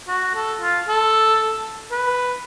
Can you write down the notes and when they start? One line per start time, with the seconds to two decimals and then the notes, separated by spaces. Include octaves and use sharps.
0.08 F#4
0.35 A4
0.61 F4
0.88 A4
1.91 B4